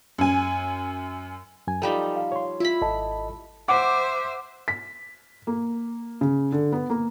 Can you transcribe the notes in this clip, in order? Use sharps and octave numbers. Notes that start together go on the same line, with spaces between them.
F#2 G#5
F#2 G#5
F3 G3 D#4 A4 G5
F5
C#5 C6
E4 F4 B5
G#1 A4 D#5 A5
C5 E5 F#5 D6
B6
A#3
C#3
D3
B3
A#3